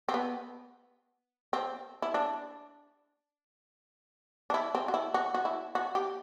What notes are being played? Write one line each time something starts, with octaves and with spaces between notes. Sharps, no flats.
C4
B3
C4
E4
D4
D4
E4
C4
F#4
E4
F#4
F#4
E4
F#4
G4